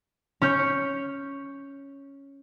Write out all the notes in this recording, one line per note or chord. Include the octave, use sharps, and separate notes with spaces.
C#4 C#5 G6